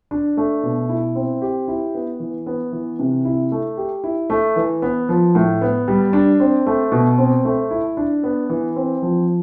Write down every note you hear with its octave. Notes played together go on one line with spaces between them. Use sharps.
D4
A3
B2
E4
C4
G4
E4
B3
E3
B3
E3
C3
E4
A3
G4
E4
A3
E3
B3
F3
A2
B3
G3
D4
C4
A3
B2
C4
A3
E4
D4
B3
E3
C4
F3